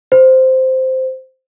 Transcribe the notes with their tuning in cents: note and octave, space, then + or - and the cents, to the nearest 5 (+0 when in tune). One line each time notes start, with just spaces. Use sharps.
C5 -5